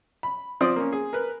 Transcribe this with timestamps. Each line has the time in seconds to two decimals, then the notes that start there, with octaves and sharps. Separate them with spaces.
0.23 B5
0.61 F3 C4 D5 D#6
0.76 A#3 C#4
0.92 G#4
1.13 A#4 B4